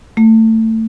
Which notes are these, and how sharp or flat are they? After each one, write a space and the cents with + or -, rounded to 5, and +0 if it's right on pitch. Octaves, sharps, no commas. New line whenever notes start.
A3 +20